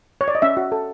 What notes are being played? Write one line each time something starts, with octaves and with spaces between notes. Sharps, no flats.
C#5
D5
D#5
C#4 E5
F#4
A4